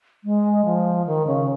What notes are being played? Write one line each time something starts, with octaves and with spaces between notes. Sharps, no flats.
G#3
F3
D#3
C#3